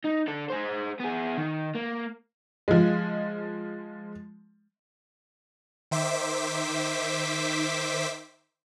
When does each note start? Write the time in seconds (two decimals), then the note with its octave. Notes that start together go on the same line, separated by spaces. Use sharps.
0.04 D#4
0.28 D3 A4
0.50 G#4 C5
1.00 B3 G#4
1.38 D#3
1.75 A#3
2.68 F3 G#3
5.91 D#3 C5 E5 D6 B6